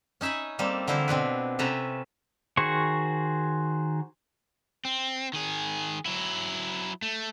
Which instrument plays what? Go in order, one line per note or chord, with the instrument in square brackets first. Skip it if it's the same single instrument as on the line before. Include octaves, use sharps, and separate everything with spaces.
[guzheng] C#4 D#4 E5 G#5 B5
G3 A#3 C4 A4
D3 E3 E4 F4 C5
B2 C4 D4 B4
C3 C#4 A4 B4 G5 A#5
[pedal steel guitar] D#3 F#4 G#4 C5 C#6
[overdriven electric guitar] C4
D#3 G#4
F#3 E4
A3